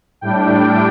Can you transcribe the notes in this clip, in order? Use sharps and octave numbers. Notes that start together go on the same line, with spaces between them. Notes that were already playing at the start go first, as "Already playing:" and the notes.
A2 G3 D4 G5